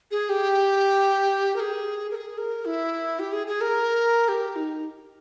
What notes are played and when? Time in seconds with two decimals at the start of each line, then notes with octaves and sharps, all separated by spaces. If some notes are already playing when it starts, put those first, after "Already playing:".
0.11 G#4
0.29 G4
1.56 A#4
1.60 G#4
2.11 A#4
2.16 G#4
2.38 A#4
2.65 E4
3.19 G4
3.33 G#4
3.47 G#4
3.61 A#4
4.28 G4
4.56 D#4